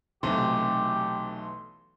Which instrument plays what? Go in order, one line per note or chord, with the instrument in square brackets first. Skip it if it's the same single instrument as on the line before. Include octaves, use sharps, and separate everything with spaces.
[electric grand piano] B1 E3 A3 [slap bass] C3 [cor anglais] G4 [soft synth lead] C6